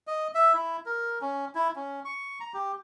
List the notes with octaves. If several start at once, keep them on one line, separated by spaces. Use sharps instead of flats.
D#5
E5
E4
A#4
C#4
E4
C#4
C#6
A#5
G4